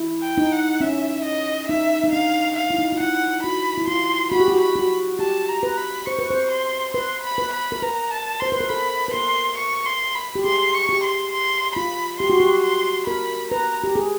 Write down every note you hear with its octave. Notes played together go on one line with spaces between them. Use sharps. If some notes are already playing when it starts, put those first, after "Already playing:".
Already playing: E4
G5
D#4
F#5
C#4 E5
D#5
D#4 E5
D#4
D4 F5
F5
E4
D#4
F4
E4 F#5
F#4 B5
E4
F4 C6
F#4 B5
G4
F#4
B5
F#4
G4 A5
A#5
B4
B5
C5 C#6
B4
C5
C6
B4 C6
B5
B4
B5
A#4
B4 A#5
A5
C5 C6
B4
A#4
A4 B5
B4
A#4 C6
C#6
C6
B5
G4
G#4 C6
C#6
G4
C6
C6
F4 B5
G4 C6
F#4
G4
C6
A#4 B5
B4 A#5
G4
G#4